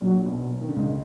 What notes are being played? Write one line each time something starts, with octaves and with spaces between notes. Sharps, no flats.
A#1 A#2 F#3
B1 B2
D#3
D3
C#2 C#3 G#3